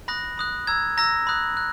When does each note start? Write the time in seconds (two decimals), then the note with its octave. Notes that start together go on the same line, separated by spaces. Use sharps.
0.08 B5 D#6 F#6 A#6
0.38 B5 D#6 F#6
0.67 A#5 E6 G#6
0.97 A#5 E6 A#6
1.27 B5 D#6 F#6
1.57 F#6